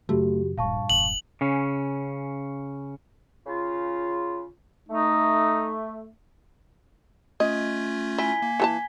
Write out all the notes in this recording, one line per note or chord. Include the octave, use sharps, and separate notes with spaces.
F#2 C#3 F#3 A3 F#4 G4
D1 G2 A#2 F5 A5 C#6
E1 F#7
C#3 C#4
C#3 F4
A3 D#4
A3 C#4 F4 D#5 G#6
E4 G#5 B6 G7
A#3
E3 A4 A5